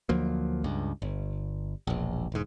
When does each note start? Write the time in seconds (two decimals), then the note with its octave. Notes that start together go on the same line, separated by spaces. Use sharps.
0.09 D2 F3 F#3 A#3
0.64 C#2 G2
1.02 G1
1.87 E1 A#1
2.32 E1 G#2